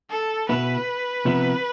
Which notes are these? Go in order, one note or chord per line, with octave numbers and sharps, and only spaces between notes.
A4
B2 B3 E4 B4
C3 F3 B3 E4